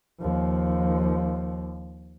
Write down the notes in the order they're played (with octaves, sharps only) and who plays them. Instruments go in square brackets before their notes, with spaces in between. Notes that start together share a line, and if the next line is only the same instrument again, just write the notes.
[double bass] D#2 F3